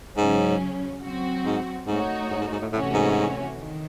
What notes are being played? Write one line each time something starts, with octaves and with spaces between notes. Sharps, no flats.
G#2 C#3 F#3 C#4
F#3 C4 F#4
G#2
G#2 A3 D#4 F#4 C#5
G#2
G#2
G#2
A2
A2 C3 E3 A3 C#4 F#4
G#2
D#3